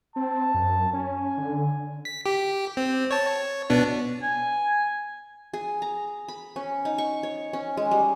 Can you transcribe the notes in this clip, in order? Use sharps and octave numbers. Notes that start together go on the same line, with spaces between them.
C4 A5
F#2
C#4 G#5
D3
B6
G4
C4
C#5 A5
C#5
B2 B3 D4
G#5
G#4
A#5
B5
C#4
D#4
C#6
C#5
C#4
G#3
G3